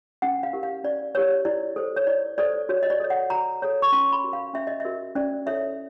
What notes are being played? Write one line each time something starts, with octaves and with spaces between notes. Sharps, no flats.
C#4 F#5
F5
E4 G4 A#4
F5
C#4 D5
E4 G4 A#4 C#5
E4 D5
A4 C5
C#5
E4 D5
A4 C5 D5
F#4 C#5
D#5
D5
A4 C#5
F#5
F#4 A#5
A4 C#5
C#6
C#4 C6
B5
F#4 A#4
F5
C#4 E5
D#5
F#4 A#4 E5
C#4 D5
E4 A4 C#5 E5